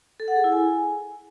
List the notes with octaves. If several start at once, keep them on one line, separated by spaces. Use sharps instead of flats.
A4
F#5
G#4
E4
G#5